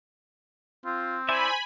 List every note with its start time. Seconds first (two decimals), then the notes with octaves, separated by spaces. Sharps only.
0.85 C4 F4
1.29 E4 C5 D5 E5 G#5 B5